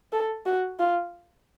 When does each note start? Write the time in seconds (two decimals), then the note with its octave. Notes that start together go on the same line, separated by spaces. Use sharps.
0.12 A4
0.46 F#4
0.79 F4